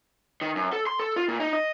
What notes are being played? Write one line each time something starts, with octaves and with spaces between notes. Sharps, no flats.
D#3
F#2
A4
C6
A4
F4
A#2
D#4
D#5